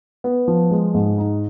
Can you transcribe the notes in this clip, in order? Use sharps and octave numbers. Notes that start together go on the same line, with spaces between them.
B3
F3
G#3
G#2
D#4